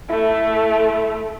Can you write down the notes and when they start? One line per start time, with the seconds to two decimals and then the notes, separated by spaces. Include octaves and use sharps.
0.10 A3 E4